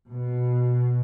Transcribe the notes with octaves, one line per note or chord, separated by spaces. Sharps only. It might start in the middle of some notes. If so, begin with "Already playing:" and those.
B2